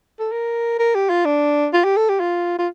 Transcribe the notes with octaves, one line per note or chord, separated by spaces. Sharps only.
A4
A#4
A#4
G4
F4
D4
F4
G4
A4
G4
F4
F4